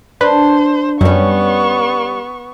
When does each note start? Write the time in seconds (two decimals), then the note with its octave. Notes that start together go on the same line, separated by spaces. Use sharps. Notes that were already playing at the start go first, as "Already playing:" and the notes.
0.21 D4 B4 C5
1.01 F#2 G3 B3 C#4 C#6